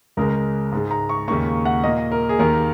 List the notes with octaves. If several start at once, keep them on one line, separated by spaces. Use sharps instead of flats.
C#2 C#3 G#3 A#4
G#2 G#3
A#5
C#6
D#2 C#3 A#3 C#6
F#5
A#2 A#3 D#5
A#4
G#4
D#2 D#3 A#3 A#4